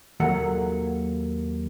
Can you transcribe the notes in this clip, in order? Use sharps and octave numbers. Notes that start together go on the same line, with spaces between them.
D#2 F#3 A#3 A4 F#5